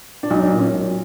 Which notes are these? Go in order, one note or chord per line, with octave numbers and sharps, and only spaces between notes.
D4
B1 D#4
D4
A#2
C#4
B1